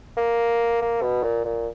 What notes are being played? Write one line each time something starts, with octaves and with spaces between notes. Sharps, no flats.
A#3
A#3
B2
A#2
A#2